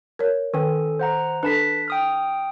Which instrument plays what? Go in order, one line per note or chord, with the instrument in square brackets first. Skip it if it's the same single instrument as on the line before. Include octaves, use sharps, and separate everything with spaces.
[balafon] A#4 C#5
[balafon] D#3 G5 [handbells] C#4 A4
[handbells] C5 F#5 A#5
[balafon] D4 A4 [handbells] B4 A5 B6
[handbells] G5 D#6 F6